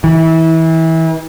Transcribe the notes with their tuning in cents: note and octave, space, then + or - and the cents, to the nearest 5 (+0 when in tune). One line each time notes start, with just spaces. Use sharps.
E3 -25